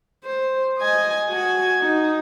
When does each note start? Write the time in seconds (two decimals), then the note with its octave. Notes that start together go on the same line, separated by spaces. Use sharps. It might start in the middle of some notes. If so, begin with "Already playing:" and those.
0.25 C5
0.79 D#5 G#5
1.29 F#4 G#5
1.80 D#4